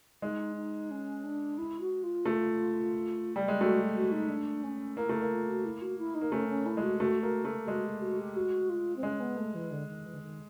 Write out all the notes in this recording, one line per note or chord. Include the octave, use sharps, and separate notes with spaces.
G#3 D#4
D#4
C#4
D4
E4
F#4
F4
A3
G3
G#3
A3 F#4
F#4
D#4
D4
C#4
A#3 E4
A3 E4 F4
A#3
F4
F#4
E4
F#4
E4
D#4
A#3
A3 C#4
C#4
E4
G#3
F#4
A3 F#4
A#3 F#4
A3 G4
G#3 F#4
G4
F#4
G4
F#4
F4
C4
G#3 C#4
B3
A3
E3
D3
D#3
E3
D3
D#3